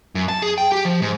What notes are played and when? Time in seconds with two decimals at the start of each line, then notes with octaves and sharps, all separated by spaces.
0.15 F#2
0.29 A5
0.42 G#4
0.58 G5
0.72 G4
0.85 F3
1.02 G#2